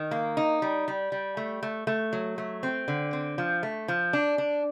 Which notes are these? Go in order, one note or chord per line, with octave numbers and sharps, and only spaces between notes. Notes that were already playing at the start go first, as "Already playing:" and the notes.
Already playing: D#3
A#3
D#4
G3
G3
G3
A3
A3
A3
F#3
A3
C4
D3
C4
F3
A3
F3
D4
D4